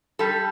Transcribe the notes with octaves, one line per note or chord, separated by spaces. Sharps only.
G3 A4